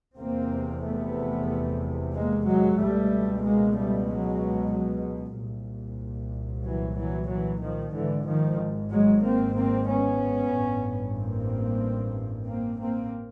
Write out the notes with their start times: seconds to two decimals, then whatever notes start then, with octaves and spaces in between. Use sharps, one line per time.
0.19 F1 E2 C3 A#3 C4
0.83 A3 B3
2.13 G#3 A#3
2.45 F#3 G#3
2.77 C#2 B2 G3 A3
3.42 G#3 A#3
3.74 G3 A3
4.06 F#3 G#3
4.72 F#3 G#3
5.36 C2 A#2
6.64 E3 F#3
6.97 E3 F#3
7.29 E3 F#3
7.62 D#3 F3
7.94 G#1 G#2 D3 E3
8.27 D#3 F3
8.91 F#3 G#3
9.24 A#3 C4
9.56 A#3 C4
9.88 B3 C#4
10.52 A1 G2
11.17 A#3 C4
12.46 A#3 C4
12.78 A#3 C4